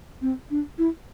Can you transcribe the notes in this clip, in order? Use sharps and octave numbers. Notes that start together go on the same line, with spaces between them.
C4
D4
E4